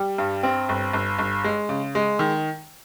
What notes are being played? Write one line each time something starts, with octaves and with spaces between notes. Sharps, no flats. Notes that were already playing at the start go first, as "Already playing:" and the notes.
Already playing: G3
G2
C4
G1
G1
G1
G#3
C#3
G#3
D#3